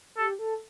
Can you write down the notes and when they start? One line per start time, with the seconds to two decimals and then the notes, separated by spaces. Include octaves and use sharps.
0.17 G4 A4
0.39 A4